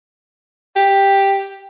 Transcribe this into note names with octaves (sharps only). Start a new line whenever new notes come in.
G4